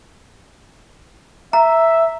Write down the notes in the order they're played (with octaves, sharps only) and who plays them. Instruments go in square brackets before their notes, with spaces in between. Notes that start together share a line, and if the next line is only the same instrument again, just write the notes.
[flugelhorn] E5 [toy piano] A#5